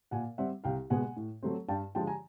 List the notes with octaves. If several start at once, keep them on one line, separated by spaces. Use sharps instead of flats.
A#2 F#5 G#5
G3 C4 E5 F#5
C2 F5 G5
B2 G#3 B3 F#5 G#5
A2
F#3 A3 C4
G2 G5 A5
D3 F3 G#3 G5 A5
G#5 A#5